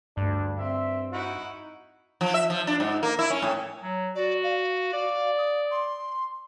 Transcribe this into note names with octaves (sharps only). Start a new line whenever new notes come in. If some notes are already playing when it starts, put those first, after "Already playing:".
D2 G2 D4
C4 E5
D#4 E4 F#4
F3
E5
F3
D4
G#2
A#3
E4
C#4
A2
F#3
F#4 D5
F5
D5
D#6
C6